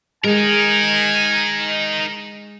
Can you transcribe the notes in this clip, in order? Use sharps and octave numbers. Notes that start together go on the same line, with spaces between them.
G#3 D#4 A#4 G#5